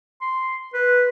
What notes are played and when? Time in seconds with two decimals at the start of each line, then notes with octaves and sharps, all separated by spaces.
0.21 C6
0.74 B4